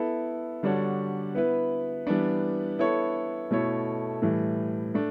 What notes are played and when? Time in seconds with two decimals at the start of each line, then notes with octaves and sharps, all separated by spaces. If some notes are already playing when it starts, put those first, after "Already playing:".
Already playing: B3 E4 A4
0.63 D3 G3 D4 F#4 C#5
1.35 B3 E4 B4
2.07 E3 G3 B3 D4
2.79 B3 E4 A4 C#5
3.50 B2 A3 E4 A4 C#5
4.22 A2 E3 G3
4.94 A3 D4